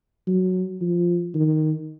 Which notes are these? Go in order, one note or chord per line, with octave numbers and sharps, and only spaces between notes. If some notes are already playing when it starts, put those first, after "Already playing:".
F#3
F3
D#3